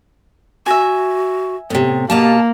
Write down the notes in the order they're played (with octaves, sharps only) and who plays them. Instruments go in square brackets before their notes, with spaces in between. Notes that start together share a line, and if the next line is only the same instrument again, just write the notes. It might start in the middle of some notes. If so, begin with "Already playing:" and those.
[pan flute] F#4 [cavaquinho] E5 G#5
[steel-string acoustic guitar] A2 C3 [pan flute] B3
[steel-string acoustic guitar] B2 F4 A5 [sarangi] A#3 [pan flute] G4